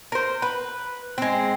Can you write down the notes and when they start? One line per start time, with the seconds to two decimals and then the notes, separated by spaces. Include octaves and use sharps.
0.12 A#4 C5
0.42 B4
1.18 G#3 C4